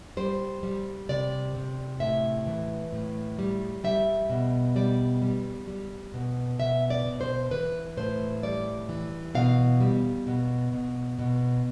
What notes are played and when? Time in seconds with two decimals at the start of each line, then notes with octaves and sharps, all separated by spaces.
0.17 G3 C5
0.63 G3
1.09 C3 D5
1.55 C3
2.00 A2 E5
2.47 E3
2.93 A2
3.39 G3
3.84 G3 E5
4.30 B2
4.76 G3 D5
5.22 G3
5.68 G3
6.14 B2
6.59 B2 E5
6.90 D5
7.05 B2
7.21 C5
7.51 E3 B4
7.97 A2 C5
8.43 G3 D5
8.89 E3
9.35 B2 F5
9.80 G3
10.26 B2
10.72 B2
11.19 B2